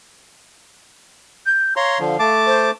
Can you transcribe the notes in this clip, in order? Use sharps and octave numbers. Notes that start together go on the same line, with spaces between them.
G6
C#5 F5 A#5 C6
D3 F3
A3 A5 D6
C5